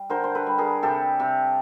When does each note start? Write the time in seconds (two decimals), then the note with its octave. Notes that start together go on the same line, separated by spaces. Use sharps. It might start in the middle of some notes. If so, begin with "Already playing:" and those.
Already playing: G3
0.10 D3 A#4 C5
0.24 C5
0.35 A4 B4
0.46 G3
0.58 G#4 A#4
0.83 C3 G4 A4
1.20 C3